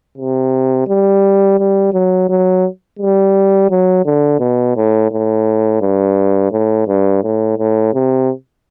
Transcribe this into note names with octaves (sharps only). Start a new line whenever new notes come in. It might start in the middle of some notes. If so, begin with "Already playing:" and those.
C3
G3
G3
F#3
F#3
G3
F#3
D3
B2
A2
A2
G2
A2
G2
A2
A2
C3